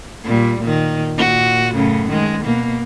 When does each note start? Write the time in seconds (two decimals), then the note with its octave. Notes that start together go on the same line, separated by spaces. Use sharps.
0.24 A#2 G3
0.60 A#2 D#3
1.17 A#2 F#4
1.73 F#2 A2 C#3
2.09 D#3 G#3
2.44 B2 A#3